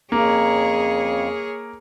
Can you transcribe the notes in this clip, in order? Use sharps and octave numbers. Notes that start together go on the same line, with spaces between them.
F2 C#3 A#3 G#4 C#5